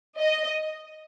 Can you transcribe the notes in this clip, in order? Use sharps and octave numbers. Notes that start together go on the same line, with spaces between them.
D#5